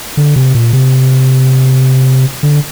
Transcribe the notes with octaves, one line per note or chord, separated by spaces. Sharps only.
D3
C3
A#2
C3
D3